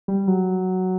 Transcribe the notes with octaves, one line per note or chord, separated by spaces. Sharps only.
G3
F#3